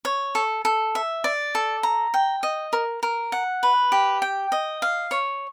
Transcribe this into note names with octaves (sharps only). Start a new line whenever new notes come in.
C#5
A4
A4
E5
D5
A4
A#5
G5
D#5
A#4
A#4
F#5
B4
G4
G5
D#5
F5
C#5